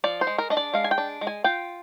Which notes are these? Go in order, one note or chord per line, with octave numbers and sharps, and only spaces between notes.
F3 D5
C5
G#3
A#4
D4 D#5
D5
G#3 F5
G#5
G5
D4
G#3
G#5
F4 G5